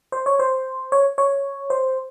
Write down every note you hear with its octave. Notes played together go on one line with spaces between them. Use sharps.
C5
C#5
C5
C#5
C#5
C5